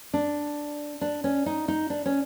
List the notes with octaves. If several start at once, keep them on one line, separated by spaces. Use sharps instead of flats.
D4
D4
C#4
D#4
D#4
D4
C#4